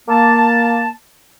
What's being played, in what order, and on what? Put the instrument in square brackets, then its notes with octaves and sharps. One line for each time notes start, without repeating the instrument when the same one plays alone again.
[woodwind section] A#3 A5